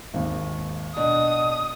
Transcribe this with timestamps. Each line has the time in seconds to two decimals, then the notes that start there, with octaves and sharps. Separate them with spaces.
0.14 G#1 D#2
0.97 B2 D4 D#6